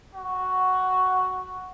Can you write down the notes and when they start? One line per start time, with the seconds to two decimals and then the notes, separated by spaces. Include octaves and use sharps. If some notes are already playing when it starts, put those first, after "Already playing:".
0.15 F#4